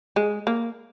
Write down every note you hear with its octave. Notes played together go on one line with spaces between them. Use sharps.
G#3
A#3